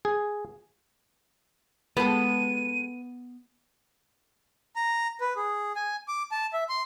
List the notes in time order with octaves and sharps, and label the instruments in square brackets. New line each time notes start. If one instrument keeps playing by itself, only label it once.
[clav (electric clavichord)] G#4
[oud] G#3 G4 A4 [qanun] B3 [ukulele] B4 [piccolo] D#7
[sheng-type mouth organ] A#5
B4
G#4
G#5
D6
A5
E5
C6